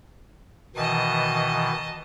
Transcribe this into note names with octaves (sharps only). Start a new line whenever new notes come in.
B2 D#3 E3 D#5 A5